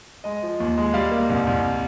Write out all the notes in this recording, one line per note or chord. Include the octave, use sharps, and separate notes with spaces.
G#3 D#5
F3
D#2
G#3
G3 F5
A#3
C2
C2